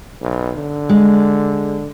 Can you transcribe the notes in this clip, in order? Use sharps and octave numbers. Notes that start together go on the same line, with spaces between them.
B1
D3
G#3